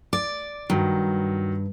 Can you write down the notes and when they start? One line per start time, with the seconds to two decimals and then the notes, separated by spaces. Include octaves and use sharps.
0.13 D5 D6
0.70 G2 D#3 F#3